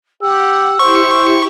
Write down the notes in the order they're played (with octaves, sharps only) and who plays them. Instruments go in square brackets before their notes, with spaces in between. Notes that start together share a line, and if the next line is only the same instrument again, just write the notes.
[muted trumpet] G4 [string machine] F#5 [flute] E6
[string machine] E4 G4 [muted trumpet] C5 [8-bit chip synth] C#6